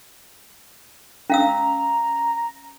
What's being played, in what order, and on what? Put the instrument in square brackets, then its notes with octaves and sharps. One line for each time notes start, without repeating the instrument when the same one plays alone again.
[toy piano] C#4 F5 E6 [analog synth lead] A#5